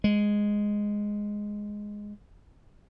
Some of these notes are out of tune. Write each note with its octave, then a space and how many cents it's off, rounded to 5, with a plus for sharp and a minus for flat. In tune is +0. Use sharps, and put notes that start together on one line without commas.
G#3 -5